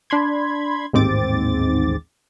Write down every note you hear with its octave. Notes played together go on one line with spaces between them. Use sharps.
D4 B5 C6 G#6
A1 D#2 G#2 C4 D6 A6